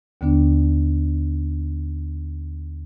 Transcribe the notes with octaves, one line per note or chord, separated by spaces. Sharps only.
D#2 D3 B3 D4